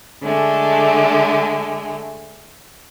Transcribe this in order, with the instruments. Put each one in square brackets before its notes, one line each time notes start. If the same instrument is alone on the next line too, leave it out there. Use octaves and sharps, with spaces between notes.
[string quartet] D3 G#3 A3